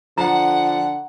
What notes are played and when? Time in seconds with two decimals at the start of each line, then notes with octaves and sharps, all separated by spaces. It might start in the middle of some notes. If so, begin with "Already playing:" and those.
0.18 D3 F3 F#5 A#5